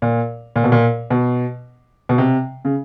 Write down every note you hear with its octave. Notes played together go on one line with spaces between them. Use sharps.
A#2
A#2
B2
A#2
B2
B2
C3
C#3